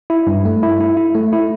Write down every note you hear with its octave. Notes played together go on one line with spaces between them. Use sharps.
E4
G2
A3
E4
E4
E4
A3
E4